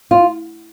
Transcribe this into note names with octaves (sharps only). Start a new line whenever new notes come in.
F4